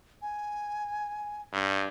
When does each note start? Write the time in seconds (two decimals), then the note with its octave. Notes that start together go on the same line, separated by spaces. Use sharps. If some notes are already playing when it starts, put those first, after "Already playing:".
0.22 G#5
1.53 G2